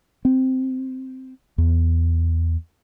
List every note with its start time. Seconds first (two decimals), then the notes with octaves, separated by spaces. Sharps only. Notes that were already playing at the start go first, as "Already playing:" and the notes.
0.25 C4
1.58 E2